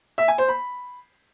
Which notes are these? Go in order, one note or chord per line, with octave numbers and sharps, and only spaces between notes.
E5
G#5
C5
B5